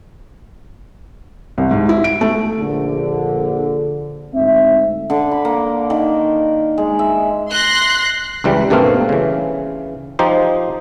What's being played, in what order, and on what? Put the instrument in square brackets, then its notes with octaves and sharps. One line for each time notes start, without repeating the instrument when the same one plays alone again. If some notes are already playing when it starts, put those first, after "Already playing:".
[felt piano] C2
G#2
E4
D7
A3
[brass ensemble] A#1 D3
D2 G#2 C4 E5
[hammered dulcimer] D3
B5
A#3
D#3
G#3
E5
[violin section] C6 F#6 A#6 C7
[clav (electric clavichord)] C#2 E3 G3
G2 B2 A3 A#3 C4 F5
C#3 E3
F3 D#4 G4 C5